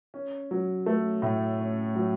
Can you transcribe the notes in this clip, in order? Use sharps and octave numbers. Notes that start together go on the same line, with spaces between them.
C#4
F#3
A3
A2
C#4
F#3